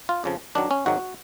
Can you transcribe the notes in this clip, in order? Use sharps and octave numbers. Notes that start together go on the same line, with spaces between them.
F4
F2 C#3 F3
F#2 D#3 F#3 D4
C#4
G#1 G#2 D#3 F#3 F#4